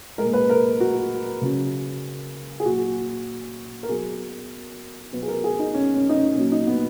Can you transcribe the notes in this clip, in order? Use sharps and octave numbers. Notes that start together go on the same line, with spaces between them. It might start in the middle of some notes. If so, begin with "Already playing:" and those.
A#2 G#3 A#4
B4
A#4
F#4
C#3 F#3
G#4
A#2 F#3 F#4
A#4
B2 F#3 G#4
B2 F#3 B4
G#4
A#4
G#4
D#4
C#4
C#4
D#4
C#4
A#2 F#3 C#4
D#4
B3